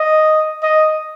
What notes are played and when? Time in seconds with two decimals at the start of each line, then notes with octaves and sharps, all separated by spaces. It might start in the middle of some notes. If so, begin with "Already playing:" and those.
Already playing: D#5
0.63 D#5